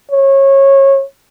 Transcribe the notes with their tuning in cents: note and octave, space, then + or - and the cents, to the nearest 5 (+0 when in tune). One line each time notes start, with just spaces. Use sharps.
C#5 -25